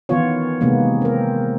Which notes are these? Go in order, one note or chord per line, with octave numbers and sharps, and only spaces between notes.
D#3 E3 B3 F4 C#5
C3 D#3 G#3 A#3 B3
C4 A#4